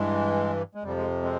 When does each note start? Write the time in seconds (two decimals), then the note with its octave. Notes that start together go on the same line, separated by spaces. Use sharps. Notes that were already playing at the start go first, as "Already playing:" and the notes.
Already playing: G2 E3 G#3
0.75 G#3
0.83 F2 C3 F3 G3
0.97 G#3
1.22 G#3 C4